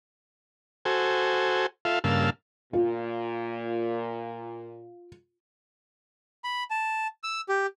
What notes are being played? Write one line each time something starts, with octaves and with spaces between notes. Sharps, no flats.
F#4 A4 C5 G#5
F4 A4 E5 F5
G2 C#3 A#3 F5 A5 E6
A#2 F4
B5
A5
E6
G4